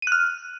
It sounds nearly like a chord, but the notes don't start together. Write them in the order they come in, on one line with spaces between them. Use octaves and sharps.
D#7 F#6 F6